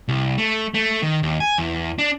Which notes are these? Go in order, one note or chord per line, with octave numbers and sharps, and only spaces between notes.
C2
A3
A3
D#3
D#2
G#5
E2
D4